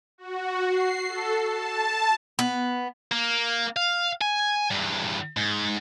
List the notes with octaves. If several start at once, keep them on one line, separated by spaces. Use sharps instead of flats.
F#4
C7
A4
A5
B3
A#3
F5
G#5
E2 G2
G#2